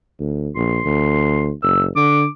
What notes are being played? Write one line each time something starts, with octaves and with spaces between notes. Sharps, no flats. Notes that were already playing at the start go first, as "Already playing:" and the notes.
D2
A#1 C6
D2
F#1 E6
D3 D6